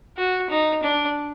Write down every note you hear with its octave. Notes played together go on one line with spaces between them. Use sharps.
F#4
D#4
D4